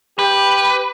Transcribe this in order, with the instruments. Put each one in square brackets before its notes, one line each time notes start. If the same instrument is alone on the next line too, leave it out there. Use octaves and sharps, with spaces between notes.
[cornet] G4 [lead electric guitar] B4